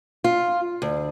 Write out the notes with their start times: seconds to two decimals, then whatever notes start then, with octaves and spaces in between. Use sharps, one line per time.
0.24 F4
0.82 D2